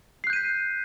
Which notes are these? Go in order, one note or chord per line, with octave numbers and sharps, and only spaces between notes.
F#6 G6 B6 C7 D#7